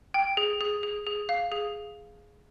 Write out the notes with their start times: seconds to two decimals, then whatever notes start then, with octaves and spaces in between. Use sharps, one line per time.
0.14 G5
0.37 G#4
0.61 G#4
0.83 G#4
1.06 G#4
1.29 F5
1.52 G#4